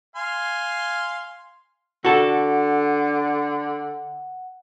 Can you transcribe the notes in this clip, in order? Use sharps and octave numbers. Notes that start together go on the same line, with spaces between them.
F5 G#5 C6
D3 F#4 A4 F#5